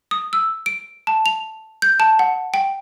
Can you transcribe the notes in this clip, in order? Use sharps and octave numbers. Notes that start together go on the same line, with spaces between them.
D#6
E6
D7
A5
F7
G6
A5
F#5
G5